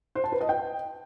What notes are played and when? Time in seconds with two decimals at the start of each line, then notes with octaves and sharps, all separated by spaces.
0.15 C5
0.24 A5
0.32 B4
0.41 D#5
0.49 G5